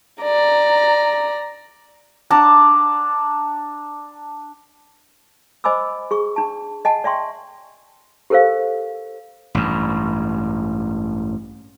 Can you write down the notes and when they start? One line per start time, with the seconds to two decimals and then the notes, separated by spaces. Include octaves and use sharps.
0.22 D5 A#5
2.30 D4 F#5 A5 A#5
5.64 C5 D#5 G#5 B5 D6 E6
6.11 G#4 C#6
6.36 D4 A5
6.85 D#5 F#5 G#5 A5
7.04 D5 E5 G5 C6 C#6
8.30 G4 A4 A#4 C5 F5
9.55 A1 G2